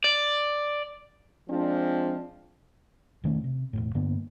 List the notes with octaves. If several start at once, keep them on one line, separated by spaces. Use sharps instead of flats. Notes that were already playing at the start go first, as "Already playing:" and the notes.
D5
F3 G#3 C4 D4
E1 D#3 A3 C#4
C3
E1 C2 A2
G2 D3 A#3 B3